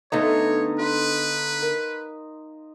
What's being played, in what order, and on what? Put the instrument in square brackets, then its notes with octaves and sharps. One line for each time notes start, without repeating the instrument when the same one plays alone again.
[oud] D3 A3 B3 [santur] D#4 F5 A#5 [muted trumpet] C#5
[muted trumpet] B4 [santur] C6 D#6
[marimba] A#4